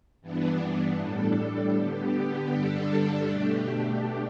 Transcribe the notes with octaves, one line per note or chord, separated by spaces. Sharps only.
G2 E3 B3 D4
A2 G3 D4 A4
D3 B3 G4
G2 D3 G3 D4 A4
B2 A3 D4 G4